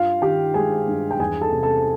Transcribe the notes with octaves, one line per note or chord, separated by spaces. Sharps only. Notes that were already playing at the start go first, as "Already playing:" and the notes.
Already playing: G2 F4 F5
D#3 G4 G5
G#3 G#4 G#5
G2
G5
E2 G#4 G#5
A4 A5
C3
A4 A5